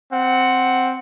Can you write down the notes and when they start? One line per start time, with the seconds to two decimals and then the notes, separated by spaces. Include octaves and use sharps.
0.12 C4 F#5